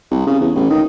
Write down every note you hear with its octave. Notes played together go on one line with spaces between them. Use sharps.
C2
C#3
E2
A1
D#3